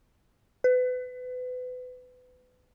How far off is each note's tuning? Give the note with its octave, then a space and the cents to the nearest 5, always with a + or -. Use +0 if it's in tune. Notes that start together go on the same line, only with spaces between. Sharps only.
B4 +30